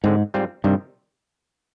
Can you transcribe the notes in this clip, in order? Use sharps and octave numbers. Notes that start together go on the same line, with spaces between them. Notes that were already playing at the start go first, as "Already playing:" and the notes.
G#2 D3 G#3 C4
G#2 G3 C4 F4
G2 C3 D#3 G3